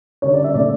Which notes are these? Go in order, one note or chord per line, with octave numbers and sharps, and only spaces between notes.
D3 G3 C#4 C#5
D5
E5
A#2 A3 C#4 D5